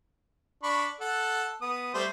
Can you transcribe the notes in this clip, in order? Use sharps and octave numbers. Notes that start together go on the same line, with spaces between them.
D4 B5 C#6
A4 F#5 A5
B3 D#6
G3 A3 C5